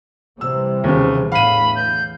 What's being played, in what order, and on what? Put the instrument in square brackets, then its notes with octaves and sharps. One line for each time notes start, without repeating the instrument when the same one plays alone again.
[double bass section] C3 E3 G3 [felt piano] E6
[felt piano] D#2 C#3
[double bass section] E2 A2 D3 [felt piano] F5 D#7 [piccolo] B5
[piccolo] G6